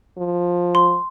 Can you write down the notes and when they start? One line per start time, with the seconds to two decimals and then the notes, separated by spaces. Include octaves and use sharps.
0.17 F3
0.75 C6